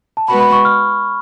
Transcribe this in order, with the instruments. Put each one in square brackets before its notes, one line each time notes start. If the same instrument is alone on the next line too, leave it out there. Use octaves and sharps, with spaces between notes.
[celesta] A5
[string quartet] G#3 B3 F#4 [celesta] B5
[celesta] B5
C#6
F6